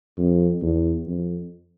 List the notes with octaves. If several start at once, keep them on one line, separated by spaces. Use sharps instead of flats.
F2
E2
F2